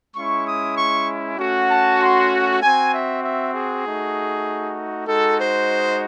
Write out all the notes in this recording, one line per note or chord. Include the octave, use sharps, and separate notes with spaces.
G#3 C#4 E4 C#6
D#6
C#6
A3 C#4 F#4
A5
C6
C4 F#4 G#5
E5
E5
G#4
A3 D#4 F#4
G#3 D#4 F#4 A4
C5